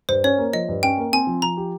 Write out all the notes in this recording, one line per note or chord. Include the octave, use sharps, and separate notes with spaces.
G2 C5
C#4 C#5
A#3
F3 D#5
G2
C#4 G5
A#3
C4 G#5
F3
F3 A#5
G4